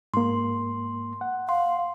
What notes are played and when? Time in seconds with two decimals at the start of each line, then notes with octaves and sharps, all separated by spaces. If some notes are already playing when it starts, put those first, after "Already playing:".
0.14 G#2 A#3 C6
1.21 F#5
1.49 F5 C6